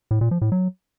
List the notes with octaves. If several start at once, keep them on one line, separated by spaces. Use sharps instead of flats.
A2
A#2
F3
A2
F#3